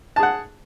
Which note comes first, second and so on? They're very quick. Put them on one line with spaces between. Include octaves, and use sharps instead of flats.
A5 G#4 F#5